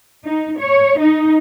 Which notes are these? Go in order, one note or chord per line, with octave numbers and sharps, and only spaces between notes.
D#4
C#5
D#4